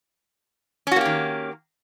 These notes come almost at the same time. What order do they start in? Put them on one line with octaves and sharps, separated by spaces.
C#4 F#4 A#3 G4 D#3